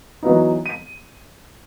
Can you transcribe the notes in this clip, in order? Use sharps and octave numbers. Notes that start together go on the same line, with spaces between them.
E3 F#3 B3 D#4
D#7